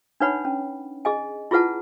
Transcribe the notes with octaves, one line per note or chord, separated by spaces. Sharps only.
D4 D#4 B4 C#5 F#5 B5
C#4
G#4 D#5 G#5
E4 F4 G#4 B4 F#5 A5